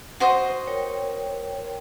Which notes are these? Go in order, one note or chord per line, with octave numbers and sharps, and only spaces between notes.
F#4 C5 D#5
A#4 C#5 G5